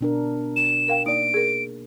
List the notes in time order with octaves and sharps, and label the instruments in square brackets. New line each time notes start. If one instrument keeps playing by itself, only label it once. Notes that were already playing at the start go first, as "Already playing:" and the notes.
[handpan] B2 D4 A#4
[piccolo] E7
[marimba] A#4 F5 G5
[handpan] A#3 [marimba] D#4 D5 [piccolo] D7
[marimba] G#4 A#4